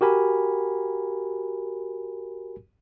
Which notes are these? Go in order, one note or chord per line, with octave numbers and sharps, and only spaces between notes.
F#4 G4 A#4 G#5 B5